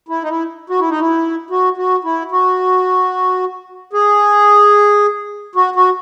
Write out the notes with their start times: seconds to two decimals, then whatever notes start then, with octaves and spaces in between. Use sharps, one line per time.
0.08 E4
0.22 D#4
0.29 E4
0.70 F#4
0.79 E4
0.90 D#4
1.00 E4
1.50 F#4
1.77 F#4
2.04 E4
2.31 F#4
3.93 G#4
5.55 F#4
5.76 F#4